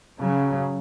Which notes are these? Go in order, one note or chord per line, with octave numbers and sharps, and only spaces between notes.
C#3 F#3